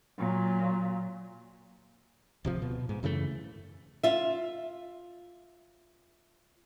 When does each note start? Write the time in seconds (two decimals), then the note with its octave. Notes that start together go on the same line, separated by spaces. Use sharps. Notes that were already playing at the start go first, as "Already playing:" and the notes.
0.18 A#2 F#3
2.45 D1 C3 F3
2.62 B2
2.89 G#2
3.03 F#2 C#3 E3 A3
4.03 F4 E5